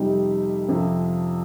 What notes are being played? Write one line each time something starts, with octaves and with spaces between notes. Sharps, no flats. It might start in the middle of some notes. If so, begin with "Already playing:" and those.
Already playing: F2 C3 G3 D#4 G4
F2 C3 F3